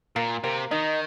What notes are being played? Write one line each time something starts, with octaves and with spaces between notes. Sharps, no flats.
A#2 A#3
C3 A#3
D#3 D#4